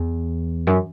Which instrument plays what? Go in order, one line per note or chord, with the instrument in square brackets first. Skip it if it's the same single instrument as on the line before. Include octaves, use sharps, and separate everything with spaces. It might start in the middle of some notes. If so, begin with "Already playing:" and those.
Already playing: [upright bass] E2
F#2